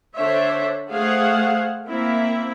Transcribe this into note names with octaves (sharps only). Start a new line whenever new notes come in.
D3 D4 A4 C5 C#5 E5
A3 G#4 C5 F5 F#5
A#3 C4 E4 E5